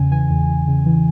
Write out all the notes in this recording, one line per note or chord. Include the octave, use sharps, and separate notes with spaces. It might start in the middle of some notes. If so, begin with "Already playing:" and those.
Already playing: E2 C#3 G#5
E3 G#5
E2
E2
C#3
E3